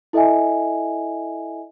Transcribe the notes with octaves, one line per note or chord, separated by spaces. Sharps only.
E4 A4 D#5 E5 G#5